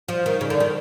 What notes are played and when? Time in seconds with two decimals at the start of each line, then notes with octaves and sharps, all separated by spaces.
0.08 F3
0.26 D#3
0.41 C#3
0.50 D3
0.60 D#3